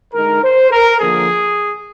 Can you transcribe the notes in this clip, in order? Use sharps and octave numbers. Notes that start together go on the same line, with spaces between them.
D3 G#3 D#4 A#4
C5
A#4
D3 F3 A#3 G#4